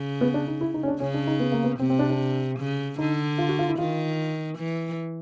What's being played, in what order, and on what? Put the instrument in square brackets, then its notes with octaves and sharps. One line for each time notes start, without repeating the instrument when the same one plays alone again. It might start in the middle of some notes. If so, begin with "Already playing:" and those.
Already playing: [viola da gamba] C#3
[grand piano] B3
D4
D#4
E4
D#4
C#4
D4
[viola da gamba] C#3 [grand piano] C#4
[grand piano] D4
D#4
B3
A#3
B3
[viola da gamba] C3 [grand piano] C4
[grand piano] C4
D4
D4
[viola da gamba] C#3
[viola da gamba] D3 [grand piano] D#4
[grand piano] F4
F#4
F4
E4
[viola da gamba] D#3 [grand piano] F4
[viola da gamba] E3